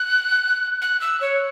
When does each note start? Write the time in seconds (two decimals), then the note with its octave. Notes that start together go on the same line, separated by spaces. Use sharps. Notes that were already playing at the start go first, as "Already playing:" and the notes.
Already playing: F#6
0.82 F#6
1.01 E6
1.21 C#5